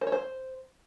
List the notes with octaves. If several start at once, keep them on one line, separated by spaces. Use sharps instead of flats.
C5
C#5
C5